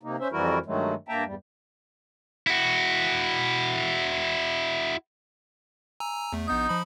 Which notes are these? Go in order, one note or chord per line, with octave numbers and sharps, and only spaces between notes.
C3 A#3 D#4
C#4 C5 E5
F2 E3 G3 E4 F#4 A#4
G2 D#3 F#3 G#3 A3
G2 A#3 E5 G5 A5 A#5
E2 G2 G3
E4 F#4
G#5 A#5 E6
E2 A3
A#1 B3 D#4 G6
F3 B5